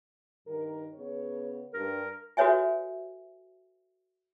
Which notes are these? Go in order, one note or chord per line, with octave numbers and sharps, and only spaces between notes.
G2 D#3 A#4
C#3 B3 C#5
G2 A#4
F#4 A4 B4 C#5 E5 G#5